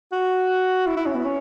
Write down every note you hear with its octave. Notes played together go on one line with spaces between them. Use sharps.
F#4
E4
E4
C#4
B3
C#4